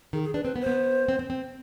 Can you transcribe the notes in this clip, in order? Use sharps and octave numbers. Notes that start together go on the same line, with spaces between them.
D#3 G#4
G#4
D4 B4
C4 B4
B3
C5
B3
C4
C4
C4